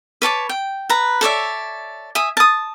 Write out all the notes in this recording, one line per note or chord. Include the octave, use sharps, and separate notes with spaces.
B4 C#5 A5 D6
G5
B4 A#5
A4 C#5 D5 E5
E5 G#5 D#6
A5 D#6